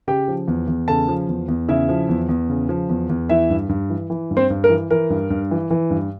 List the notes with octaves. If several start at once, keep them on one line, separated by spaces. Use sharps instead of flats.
C#3 G4 G5
F3
E2
E2
C#3 A4 A5
F3
E2
E2
C#3 E4 E5
F3
E2
E2
C#3
F3
E2
E2
E3 E4 E5
G2
G2
E3
E3
G2
C4 C5
G2
A#4
E3
E3 A#4
G2
G2
E3
E3
G2